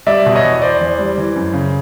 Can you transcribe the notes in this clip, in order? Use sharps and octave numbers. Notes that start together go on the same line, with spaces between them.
G3 D5 E5
B2
C#5 D#5
E2
E2 C5 D5
E2
G3
E3
F#2
C#3